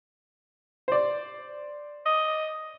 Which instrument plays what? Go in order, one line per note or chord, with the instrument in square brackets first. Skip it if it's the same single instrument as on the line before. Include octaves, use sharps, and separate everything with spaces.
[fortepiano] C5 D5
[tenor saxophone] D#5